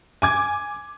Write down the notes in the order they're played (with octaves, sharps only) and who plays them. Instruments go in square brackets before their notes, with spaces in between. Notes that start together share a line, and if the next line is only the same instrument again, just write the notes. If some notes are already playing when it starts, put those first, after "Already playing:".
[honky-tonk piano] G#5 D6 G#6